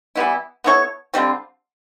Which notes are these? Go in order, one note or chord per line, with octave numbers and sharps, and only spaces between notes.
E3 G3 B3 E4
B3 E4 A4 C#5
D3 G3 C4 F4